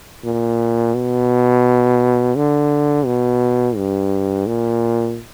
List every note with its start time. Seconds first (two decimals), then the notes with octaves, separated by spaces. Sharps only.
0.25 A#2
0.95 B2
2.36 D3
3.06 B2
3.76 G2
4.47 A#2